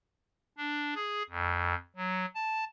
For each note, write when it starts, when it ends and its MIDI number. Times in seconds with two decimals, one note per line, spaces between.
0.58 0.94 62
0.95 1.23 68
1.30 1.74 41
1.96 2.26 54
2.35 2.64 81